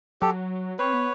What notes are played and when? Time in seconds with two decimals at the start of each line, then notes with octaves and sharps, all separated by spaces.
0.21 F#3 G4 A4
0.79 C4 B4 C#5
0.93 B3